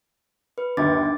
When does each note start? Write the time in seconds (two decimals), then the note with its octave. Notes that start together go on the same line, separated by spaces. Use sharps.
0.58 B4
0.77 G1 D#2 D4 D6 A6